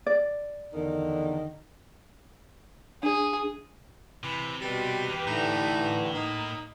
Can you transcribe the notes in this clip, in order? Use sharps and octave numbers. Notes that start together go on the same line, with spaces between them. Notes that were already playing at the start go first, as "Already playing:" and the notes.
D5
E2 D3 D#3
D4 G#4
C3 E3 B5
B2 G3 G4 B4
E2 A#3
A2 D3 E3 A3 D#4
A#3 D#4